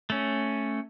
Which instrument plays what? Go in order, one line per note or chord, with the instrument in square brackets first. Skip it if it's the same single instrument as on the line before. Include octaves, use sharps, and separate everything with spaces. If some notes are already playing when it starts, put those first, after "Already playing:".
[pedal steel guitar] A3 C#4